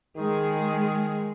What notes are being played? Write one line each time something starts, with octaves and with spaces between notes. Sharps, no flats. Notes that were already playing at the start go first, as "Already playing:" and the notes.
D#3 G#3 G#4